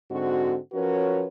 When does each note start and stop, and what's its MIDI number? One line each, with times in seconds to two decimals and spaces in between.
0.11 0.56 44
0.11 0.56 50
0.11 0.56 60
0.11 0.56 66
0.73 1.26 53
0.73 1.26 61
0.73 1.26 66
0.73 1.26 70
0.73 1.26 71
0.73 1.26 73